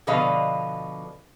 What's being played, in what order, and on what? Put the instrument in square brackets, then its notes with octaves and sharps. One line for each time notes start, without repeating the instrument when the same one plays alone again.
[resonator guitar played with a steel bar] B2 D3 F3 B4 D#5 F5